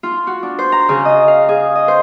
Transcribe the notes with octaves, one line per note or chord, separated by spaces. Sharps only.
F4
F#4
D4
C5
A#5
C#3
D#5
F5
G#4
D#5
C5